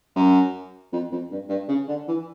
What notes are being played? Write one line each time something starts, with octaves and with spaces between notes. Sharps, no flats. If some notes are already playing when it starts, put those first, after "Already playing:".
F#2
F2
F2
G2
G2
C#3
D3
E3